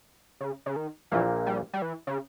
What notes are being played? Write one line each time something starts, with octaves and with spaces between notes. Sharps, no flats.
C#3
C#3
D#3
A#1 A#2 E3 A#3
G3
G3
E3
C#3